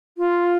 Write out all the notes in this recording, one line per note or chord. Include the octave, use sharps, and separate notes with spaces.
F4